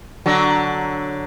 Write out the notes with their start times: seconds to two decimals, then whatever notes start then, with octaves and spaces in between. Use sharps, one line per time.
0.26 D3 F#3